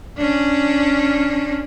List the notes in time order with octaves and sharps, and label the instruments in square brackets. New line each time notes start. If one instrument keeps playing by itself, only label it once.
[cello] C#4 D4